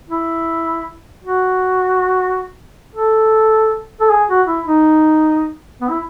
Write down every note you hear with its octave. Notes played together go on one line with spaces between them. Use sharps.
E4
F#4
A4
A4
G#4
F#4
E4
D#4
B3
E4